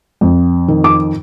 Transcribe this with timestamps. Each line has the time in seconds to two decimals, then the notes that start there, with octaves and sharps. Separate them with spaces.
0.21 F2
0.68 D#3
0.84 D6